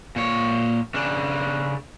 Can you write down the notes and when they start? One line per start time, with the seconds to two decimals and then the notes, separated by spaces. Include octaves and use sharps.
0.16 A#2 C#5
0.94 C#3 D4